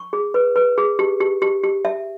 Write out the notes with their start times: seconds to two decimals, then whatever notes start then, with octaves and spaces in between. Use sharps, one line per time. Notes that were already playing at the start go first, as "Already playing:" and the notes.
Already playing: C#6
0.13 G#4
0.34 B4
0.56 B4
0.78 G#4
0.99 G4
1.20 G4
1.42 G4
1.64 G4
1.85 E5